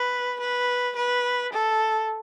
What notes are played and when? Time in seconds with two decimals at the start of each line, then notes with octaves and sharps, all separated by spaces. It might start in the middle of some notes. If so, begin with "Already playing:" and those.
Already playing: B4
0.40 B4
0.96 B4
1.53 A4